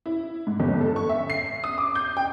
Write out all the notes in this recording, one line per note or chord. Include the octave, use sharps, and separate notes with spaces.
E4
G#2
G1
A4
C#6
E5
C7
D#6
D6
G6
G5